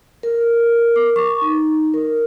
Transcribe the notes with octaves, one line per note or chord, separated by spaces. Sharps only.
A#4
D6
C#6
D#4
A#4